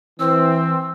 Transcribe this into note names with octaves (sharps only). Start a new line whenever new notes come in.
E3 C4 E6